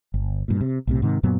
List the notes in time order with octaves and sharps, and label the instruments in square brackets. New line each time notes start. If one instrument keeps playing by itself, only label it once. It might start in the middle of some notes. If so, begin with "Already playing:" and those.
[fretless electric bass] G1
G2 A#2
C3
B1 A2 C3
G#2 C3 D#3
F#2 A#2 F#3 B3